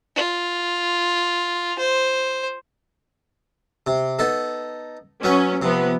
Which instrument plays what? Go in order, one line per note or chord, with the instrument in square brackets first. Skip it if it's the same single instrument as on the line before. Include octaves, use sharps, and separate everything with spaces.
[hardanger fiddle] F4
C5
[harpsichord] C3
B3 D#4 A4
[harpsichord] F#3 B3 B4 [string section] C#4
[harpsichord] C3 [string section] F3 B3